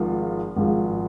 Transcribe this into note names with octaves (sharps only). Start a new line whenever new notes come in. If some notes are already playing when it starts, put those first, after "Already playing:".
Already playing: G#1 G#2 F3
G#1 G#2 F3